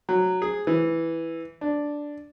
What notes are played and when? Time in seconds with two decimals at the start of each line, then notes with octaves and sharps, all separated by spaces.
0.09 F#3
0.42 G#4
0.67 E3
1.61 D4